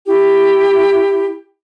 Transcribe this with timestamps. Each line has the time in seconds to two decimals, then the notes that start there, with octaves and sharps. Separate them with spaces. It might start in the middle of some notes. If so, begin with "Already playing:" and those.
0.07 E4 G4